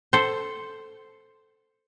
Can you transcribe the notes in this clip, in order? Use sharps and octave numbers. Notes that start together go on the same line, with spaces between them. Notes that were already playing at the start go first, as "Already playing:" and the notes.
A4 C5